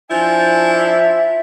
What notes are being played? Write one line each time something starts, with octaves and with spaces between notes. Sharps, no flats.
F3 D4 E4 G#5
E5